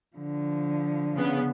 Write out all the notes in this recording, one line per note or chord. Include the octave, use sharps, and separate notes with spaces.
D3 F3
C#3 B3